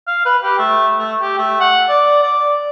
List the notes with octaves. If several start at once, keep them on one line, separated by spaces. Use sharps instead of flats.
F5
B4
G4
A3
A3
G4
A3
F#5
D5
D5